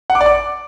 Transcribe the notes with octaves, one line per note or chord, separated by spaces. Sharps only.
F#5
D6
D5
D6